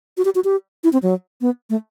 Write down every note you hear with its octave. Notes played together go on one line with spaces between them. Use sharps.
F#4
G4
F#4
G4
E4
C4
F#3
B3
A3